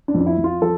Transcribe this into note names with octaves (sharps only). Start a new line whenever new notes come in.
D4
F2
D4
E4
F2
F4
F3 A4